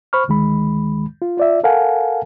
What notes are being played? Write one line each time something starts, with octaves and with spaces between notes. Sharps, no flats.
C5 B5 C#6 F6
D2 D#3 G#3 B5
F4
F4 D5 E5
A4 A#4 F5 F#5 G#5 A5